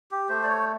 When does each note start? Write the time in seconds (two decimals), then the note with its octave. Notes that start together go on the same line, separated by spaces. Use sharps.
0.11 G4
0.29 A3 C5
0.44 D5
0.48 C#5